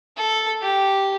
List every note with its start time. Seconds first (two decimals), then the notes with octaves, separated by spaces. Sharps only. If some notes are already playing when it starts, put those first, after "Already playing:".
0.17 A4
0.61 G4